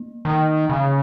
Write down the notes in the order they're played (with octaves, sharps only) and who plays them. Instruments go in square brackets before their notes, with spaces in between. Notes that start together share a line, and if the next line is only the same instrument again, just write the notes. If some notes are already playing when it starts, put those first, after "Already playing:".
Already playing: [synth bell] A#3
[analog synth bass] D#3
C#3